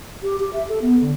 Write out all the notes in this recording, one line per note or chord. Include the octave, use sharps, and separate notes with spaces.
G4
G4
E5
A4
B3
D3